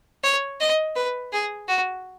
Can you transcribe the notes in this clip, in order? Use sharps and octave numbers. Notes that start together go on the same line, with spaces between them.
C#5
D#5
B4
G#4
F#4